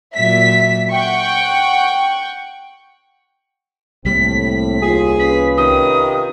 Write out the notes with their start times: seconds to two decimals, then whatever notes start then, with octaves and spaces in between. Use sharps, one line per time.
0.15 A#2 F#3 E5 B6
0.93 F#5 G5 C#6
4.05 C2 A2 G3 A#3 C4 B6
4.82 D#2 F4 G#4
5.19 C#4 F4 B4 B6
5.57 C3 D#3 D#6